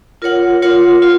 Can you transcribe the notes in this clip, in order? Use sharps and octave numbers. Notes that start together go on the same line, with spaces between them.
F4 A#4 C#5 F#5
F4 A#4 C#5 F#5
F4